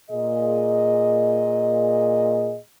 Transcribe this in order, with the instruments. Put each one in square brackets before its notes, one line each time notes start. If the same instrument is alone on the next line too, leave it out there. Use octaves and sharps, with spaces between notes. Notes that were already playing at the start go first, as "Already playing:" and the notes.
[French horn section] A#2 G#4 D#5